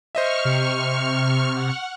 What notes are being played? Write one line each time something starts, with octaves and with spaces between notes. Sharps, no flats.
C5 D#5 E5 C#6 F6
C3
F#5